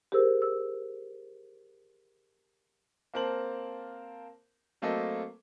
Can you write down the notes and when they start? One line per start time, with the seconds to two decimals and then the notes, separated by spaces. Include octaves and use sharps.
0.12 G4 G#4 A#4 C5 E6
0.42 E6
3.14 A#3 C4 A#4 C5 A5 F#7
4.82 F#3 A3 A#3 C4 A4 D#5